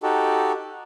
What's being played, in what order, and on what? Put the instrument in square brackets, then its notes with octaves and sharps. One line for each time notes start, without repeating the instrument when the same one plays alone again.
[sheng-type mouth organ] D#4 F#4 G4 A4